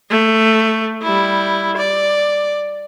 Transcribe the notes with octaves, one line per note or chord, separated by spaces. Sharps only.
A3
G3 E4
D5